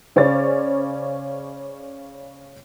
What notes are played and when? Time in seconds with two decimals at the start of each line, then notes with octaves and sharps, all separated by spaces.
0.16 C#3 C#4 C5 D5 A6